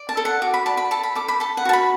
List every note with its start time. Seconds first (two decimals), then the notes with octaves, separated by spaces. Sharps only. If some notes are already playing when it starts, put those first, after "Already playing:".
Already playing: D5
0.09 A5
0.17 A4
0.25 F#5
0.42 F#4 D6
0.54 B5
0.66 D5 A5
0.77 B5
0.91 A4 A5
1.03 B5
1.15 A4 D6
1.28 B5
1.40 A4 A5
1.57 F#5
1.65 F#4 A5
1.73 B5